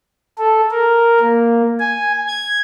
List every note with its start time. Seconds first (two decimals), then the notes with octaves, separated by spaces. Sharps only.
0.38 A4
0.71 A#4
1.20 A#3
1.80 G#5
2.28 G#6